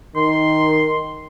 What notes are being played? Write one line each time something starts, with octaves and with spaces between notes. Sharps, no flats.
D#3 C6